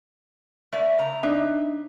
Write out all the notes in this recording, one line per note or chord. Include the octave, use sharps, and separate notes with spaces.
A3 D5 E5
C#3 A#5
D4 D#4 E5